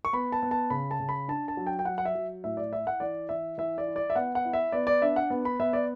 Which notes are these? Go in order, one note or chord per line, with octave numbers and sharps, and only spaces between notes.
C#6
B3 B5
A5
B3
A5
C#3 B5
A5
C#3
B5
D4 A5
A5
F#3
G5
G5
F#3 F#5
F#5
E5
F#3
A2 E5
D5
E4 E5
F#5
E3 D5
E3 E5
E3 E5
D5
E4
D5
E5
B3 F#5
F#5
E4
E5
B3 D5
D5
D4 E5
F#5
B3
B5
B3 E5
D5